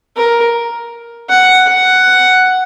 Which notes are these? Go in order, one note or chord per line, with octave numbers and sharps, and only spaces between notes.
A#4
F#5
F#5